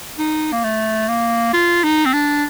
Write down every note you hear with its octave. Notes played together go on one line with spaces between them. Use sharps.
D#4
A#3
A3
A#3
F4
D#4
C4
D4